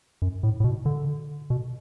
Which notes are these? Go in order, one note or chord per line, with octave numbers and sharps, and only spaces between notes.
F#2
A2
A2
B2
D3
B2